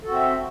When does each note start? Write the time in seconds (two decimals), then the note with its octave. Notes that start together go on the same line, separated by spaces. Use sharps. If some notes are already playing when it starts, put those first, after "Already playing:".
0.03 A4
0.07 F#4
0.11 C4
0.15 E5